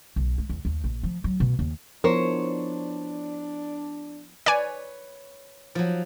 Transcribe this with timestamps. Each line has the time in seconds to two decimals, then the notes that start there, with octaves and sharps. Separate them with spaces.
0.16 B1
0.38 G#3
0.49 E2
0.65 D#2
0.84 A#1
1.03 F3
1.24 F#3
1.40 B2
1.59 D#2
2.04 F3 B3 D4 E4 A#4 C5 C#5
4.46 B4 C#5 D5 G#5
5.75 F3 F#3